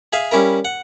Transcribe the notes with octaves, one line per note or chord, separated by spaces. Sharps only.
G#4 E5 F5 G#5
G3 C#4 E4 A#4
F#5